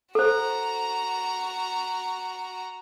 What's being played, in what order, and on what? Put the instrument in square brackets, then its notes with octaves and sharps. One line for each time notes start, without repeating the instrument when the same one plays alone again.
[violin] F#4 A#5 [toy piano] A4 C5